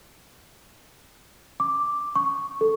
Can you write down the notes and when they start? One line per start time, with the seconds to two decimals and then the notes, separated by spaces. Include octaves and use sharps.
1.60 D6
2.16 C#6
2.61 A4